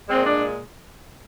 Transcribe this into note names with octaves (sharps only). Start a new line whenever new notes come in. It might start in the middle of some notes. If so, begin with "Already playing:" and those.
A#2 G#3 C4
D4